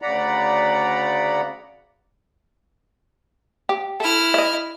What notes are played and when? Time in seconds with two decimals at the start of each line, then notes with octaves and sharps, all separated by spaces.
0.02 D2 C#3 D5 F#5 A#5 B5
3.69 G4
4.00 E4 A4 F6
4.34 D#5 E5